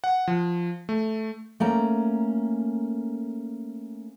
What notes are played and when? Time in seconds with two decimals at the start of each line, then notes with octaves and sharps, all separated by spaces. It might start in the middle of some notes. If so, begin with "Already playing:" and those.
0.04 F#5
0.28 F3
0.89 A3
1.60 A3 A#3 C#4 A#5